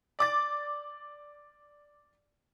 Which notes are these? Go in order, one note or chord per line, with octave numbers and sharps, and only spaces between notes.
D5 D6 A6